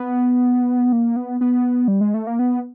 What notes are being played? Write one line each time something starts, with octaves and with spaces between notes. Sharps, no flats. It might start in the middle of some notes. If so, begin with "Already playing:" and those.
Already playing: B3
A#3
B3
B3
G3
G#3
A3
A#3
B3